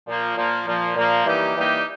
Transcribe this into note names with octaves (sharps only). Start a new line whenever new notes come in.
A#2 F3 A#3
A#2 F3 A#3
A#2 F3 A#3
A#2 F3 A#3
E3 G3 A#3 D#4 G4
E3 G3 A#3 D#4 G4